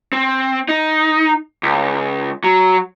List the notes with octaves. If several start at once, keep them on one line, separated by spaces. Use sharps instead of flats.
C4
D#4
C#2
F#3